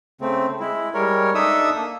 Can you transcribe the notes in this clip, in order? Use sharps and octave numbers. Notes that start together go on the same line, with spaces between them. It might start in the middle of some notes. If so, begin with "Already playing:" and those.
C#3 A3 C4
G#3 E4
G3 G#3 A#4 C#5
D4 D#4 A4 E5 D#6 E6
A#3